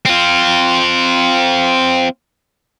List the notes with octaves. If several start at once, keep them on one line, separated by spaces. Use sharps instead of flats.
C4 F4